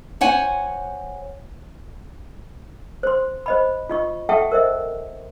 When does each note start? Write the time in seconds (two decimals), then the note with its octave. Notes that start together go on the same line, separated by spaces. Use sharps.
0.21 C5 C#5 F#5 G#5
3.03 C5 C6
3.46 C5 D#5 B5
3.89 F4 D#5 C#6
4.29 A4 E5 F#5 G5 A5 C#6
4.52 A#4 C5 D#5 E5